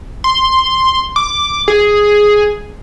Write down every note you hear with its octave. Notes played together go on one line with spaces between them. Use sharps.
C6
D6
G#4